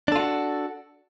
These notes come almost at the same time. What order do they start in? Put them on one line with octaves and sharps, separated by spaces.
D4 A4 F4 F#4